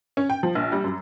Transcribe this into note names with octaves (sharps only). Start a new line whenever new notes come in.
C#4
G5
F3
A#1
G3
F#2